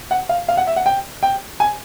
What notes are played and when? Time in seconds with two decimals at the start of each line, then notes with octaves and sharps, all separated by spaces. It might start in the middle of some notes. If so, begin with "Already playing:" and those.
0.11 F#5
0.29 F5
0.48 F5
0.57 F#5
0.67 E5
0.76 F#5
0.86 G5
1.23 G5
1.60 G#5